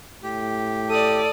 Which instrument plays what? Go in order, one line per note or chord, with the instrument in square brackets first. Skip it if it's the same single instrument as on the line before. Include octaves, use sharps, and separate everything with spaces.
[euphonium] A2 [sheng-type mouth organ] G4
[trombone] A4 [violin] D5 D#6